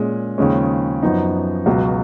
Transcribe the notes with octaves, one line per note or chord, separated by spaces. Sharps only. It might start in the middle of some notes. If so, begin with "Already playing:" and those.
Already playing: A#2 G#3 C#4
D#2 C#3 F3 G#3 C#4
F#2 F3 B3 D#4
C#2 B2 F#3